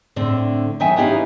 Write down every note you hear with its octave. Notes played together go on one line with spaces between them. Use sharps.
A2 D3 C4
D#3 F#3 E5 G5 G#5
B3 C#4 D#4 E4 G4 F5